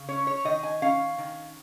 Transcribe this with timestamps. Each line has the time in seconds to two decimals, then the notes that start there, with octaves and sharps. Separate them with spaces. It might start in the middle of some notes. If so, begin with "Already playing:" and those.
Already playing: C#3
0.08 C#4 C#5
0.27 C#5
0.45 D#3 D#5
0.63 G#5
0.82 C#4 F5
1.18 D#3